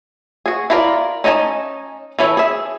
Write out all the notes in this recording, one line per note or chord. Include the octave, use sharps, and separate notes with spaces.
F#4 G#4
E4 F4 A#4 B4 D5
C#4 D#4 D#5 G#5 A5
E3 C#4 E4 A4
G#4 E5